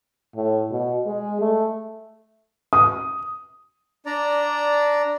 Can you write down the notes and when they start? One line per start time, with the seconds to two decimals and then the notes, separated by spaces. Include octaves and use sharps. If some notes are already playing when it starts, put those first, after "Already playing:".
0.36 A2
0.71 B2
1.06 G#3
1.41 A3
2.73 D#6
4.06 D4 D5 A#5